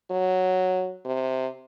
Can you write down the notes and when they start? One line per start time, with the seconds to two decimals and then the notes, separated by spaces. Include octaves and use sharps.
0.11 F#3
1.05 C3